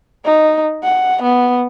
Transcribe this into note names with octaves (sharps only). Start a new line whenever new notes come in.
D#4
F#5
B3